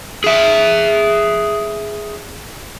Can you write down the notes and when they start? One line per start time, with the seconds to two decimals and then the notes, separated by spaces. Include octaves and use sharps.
0.24 G#4 E5